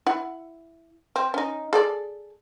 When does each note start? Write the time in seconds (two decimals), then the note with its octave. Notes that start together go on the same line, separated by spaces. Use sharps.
0.07 E4 F#5
1.16 C4
1.34 C#4 D#4
1.73 G#4 A4 D5